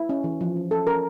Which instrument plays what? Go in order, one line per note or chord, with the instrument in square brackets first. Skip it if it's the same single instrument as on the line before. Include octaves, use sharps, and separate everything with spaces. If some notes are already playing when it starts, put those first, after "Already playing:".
Already playing: [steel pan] E4
C#4
E3
F3
C#4
C#4 A4
C#4 A#4